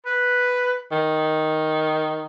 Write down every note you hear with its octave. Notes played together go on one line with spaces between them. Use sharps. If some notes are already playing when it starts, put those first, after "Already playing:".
B4
D#3